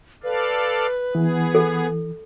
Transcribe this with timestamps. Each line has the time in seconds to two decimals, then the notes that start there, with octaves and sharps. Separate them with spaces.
0.23 A4 B4 D5 F5
1.15 E3 B3 G#4
1.55 A4